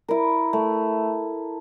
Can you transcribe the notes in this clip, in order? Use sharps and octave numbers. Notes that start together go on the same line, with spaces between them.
E4 A#4
A3